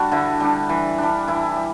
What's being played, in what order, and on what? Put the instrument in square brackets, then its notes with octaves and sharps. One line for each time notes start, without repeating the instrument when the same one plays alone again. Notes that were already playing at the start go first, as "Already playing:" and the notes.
Already playing: [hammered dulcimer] G3 D4 F#4 A4
D3 E4
G3 D4
E3
G3 D4
E3 E4
G3